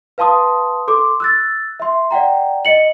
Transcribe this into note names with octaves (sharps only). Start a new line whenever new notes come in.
B4 F5 A5 C6 D#6
A4 C6 D6
E6 F#6 A6
E5 C6
D5 F#5 G5 A#5
D#5 C#7 F#7